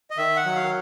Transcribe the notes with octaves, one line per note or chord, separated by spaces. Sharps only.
D#5
D#3 E5
F#5
F#3
F5